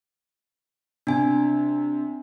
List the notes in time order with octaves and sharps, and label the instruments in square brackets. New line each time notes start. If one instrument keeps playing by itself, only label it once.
[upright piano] C3 [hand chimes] D4 G#5